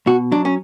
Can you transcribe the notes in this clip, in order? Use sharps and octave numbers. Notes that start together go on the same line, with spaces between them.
B2 F#4
F#3 D4
C#4